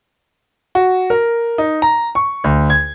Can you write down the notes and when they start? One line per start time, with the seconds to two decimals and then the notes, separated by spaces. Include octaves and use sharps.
0.75 F#4
1.10 A#4
1.58 D#4
1.82 A#5
2.15 C#6
2.44 D2
2.70 G#6